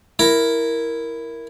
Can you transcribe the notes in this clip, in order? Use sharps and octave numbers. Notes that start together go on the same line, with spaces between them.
E4 A#4